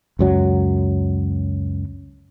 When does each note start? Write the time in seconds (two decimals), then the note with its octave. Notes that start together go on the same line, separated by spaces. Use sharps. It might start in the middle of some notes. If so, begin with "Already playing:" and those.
0.19 C#2 F#2 F#3